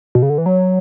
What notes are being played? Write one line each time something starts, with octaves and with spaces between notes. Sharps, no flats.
B2
C#3
D3
E3
F#3